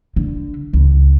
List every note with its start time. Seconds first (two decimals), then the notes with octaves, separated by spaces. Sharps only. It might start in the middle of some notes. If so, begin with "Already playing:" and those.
0.16 D3
0.73 C#2